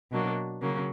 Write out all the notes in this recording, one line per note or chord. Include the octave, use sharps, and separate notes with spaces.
B2 F#3 A#3 D4
C#3 F#3 A#3